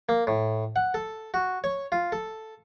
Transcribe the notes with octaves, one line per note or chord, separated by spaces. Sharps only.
A#3
A2
F#5
A4
F#4
C#5
F4
A4